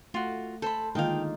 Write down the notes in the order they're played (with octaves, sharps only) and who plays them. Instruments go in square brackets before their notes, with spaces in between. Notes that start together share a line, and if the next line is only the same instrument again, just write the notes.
[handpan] A3 [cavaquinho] F4 F#4
[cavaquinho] A4 B5 [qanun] C5
[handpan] D3 D#3 G#3 [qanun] A#3 D#4 F4 [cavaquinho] F5 G5